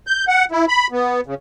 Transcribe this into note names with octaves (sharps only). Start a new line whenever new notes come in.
G6
F#5
E4
B5
B3
C#3